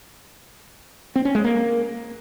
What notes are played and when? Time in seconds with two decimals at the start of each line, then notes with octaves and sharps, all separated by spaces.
1.16 C4
1.25 C#4
1.35 G#3
1.44 A#3